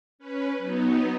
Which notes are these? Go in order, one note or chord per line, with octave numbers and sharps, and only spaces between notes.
C#4 B4
F#3 B3 D#4